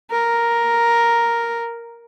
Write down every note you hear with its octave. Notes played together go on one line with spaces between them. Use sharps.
A#4